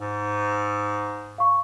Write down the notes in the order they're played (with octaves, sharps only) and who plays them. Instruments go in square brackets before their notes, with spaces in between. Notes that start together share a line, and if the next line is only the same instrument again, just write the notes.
[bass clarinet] G#2
[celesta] F5 C#6